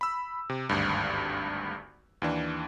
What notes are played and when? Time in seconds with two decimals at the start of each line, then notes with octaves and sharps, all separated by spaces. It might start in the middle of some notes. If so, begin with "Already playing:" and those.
0.01 B5 E6
0.49 C3
0.69 G#1 D2 G2
2.22 D#2 E3 D4